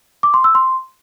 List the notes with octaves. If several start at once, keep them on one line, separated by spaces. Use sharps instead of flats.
D6
C6
E6
C6